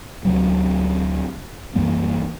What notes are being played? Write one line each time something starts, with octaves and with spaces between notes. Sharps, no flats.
D2 C3 F#3
C2 F#2 E3 A#3